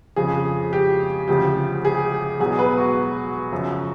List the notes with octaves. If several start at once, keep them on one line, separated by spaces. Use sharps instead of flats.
F2 C#3 F3 G#4
G4
D2 C#3 F3 G4
G#4
E2 B2 F#3 G#4
B4
F#4
F#2 C#3 F3